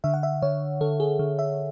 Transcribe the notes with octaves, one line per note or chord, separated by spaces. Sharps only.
D3 E5
F#5
E5
D3 C#5
D3 A4
G#4
D3
E5